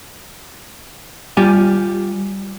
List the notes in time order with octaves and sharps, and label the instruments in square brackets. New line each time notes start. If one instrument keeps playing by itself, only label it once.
[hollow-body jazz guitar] G3 F4 G4 G#5